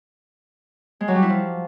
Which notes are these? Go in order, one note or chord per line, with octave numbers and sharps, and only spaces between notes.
G#3
F#3
G3
E4
F3